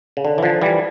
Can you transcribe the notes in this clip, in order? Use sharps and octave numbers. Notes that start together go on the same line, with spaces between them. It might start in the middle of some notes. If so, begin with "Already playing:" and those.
C#3
D3
E3
D3 F3
E3 G3